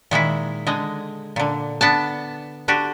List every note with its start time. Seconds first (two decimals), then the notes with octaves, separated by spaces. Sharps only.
0.11 A#2 D#3 G#3 E4
0.67 D3 G#3 D#5
1.36 A#2 D3
1.81 B3 D4 A5
2.68 D3 D4 F#4 G4